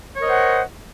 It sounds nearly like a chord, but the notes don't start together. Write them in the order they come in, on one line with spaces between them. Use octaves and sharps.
C#5 A#4 D#5 C5 F#5